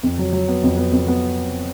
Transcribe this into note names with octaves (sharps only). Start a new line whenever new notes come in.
F2
F#3
F#3
B3
F2
B3
F2
B3